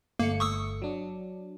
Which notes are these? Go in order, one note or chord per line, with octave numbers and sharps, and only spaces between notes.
G1 A3 A#3 C#7
C#6 D#6 E6
F#3 D4